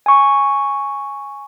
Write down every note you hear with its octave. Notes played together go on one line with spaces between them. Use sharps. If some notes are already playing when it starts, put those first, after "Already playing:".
G#5 C#6